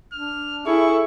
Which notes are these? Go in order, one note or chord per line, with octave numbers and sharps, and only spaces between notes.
D4 F6
E4 G#4 A4 C#6